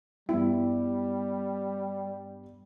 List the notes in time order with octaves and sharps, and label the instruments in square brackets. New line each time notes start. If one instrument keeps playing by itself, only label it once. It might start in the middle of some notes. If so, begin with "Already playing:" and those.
[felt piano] G2 B3 [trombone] G3 [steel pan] E4